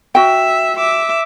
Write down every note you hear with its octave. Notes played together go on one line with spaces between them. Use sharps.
F#4 E5 G5
E5 D6